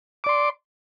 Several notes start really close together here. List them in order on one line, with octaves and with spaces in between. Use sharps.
D6 D5 C6